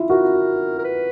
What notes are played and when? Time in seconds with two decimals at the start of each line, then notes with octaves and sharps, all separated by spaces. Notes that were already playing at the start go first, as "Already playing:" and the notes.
Already playing: E4 F4
0.10 F#4 A#4
0.79 A#4
0.84 B4